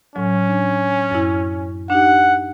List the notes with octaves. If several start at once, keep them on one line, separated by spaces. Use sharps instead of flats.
A2 F#3 C#4
D4
F#2 E4
D4 D#4 G4 F#5